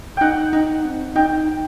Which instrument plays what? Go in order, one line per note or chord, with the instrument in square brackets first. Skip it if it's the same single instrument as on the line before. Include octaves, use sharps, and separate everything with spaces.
[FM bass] D#4 [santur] F#5 G5
[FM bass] D#4
C4
[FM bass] D#4 [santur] G5